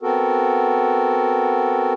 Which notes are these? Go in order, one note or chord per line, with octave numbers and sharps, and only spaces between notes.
B3 C4 F#4 A4 A#4